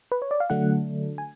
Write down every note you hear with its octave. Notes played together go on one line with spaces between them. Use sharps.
B4
C#5
D5
F5
D3 F#3 A3 D4 F#5
G#5